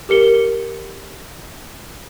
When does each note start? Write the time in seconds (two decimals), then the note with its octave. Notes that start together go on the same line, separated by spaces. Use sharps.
0.09 G4 A#4 C#7 G7